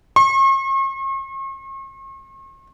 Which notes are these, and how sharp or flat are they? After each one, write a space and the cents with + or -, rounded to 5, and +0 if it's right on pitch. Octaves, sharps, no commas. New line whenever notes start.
C#6 -45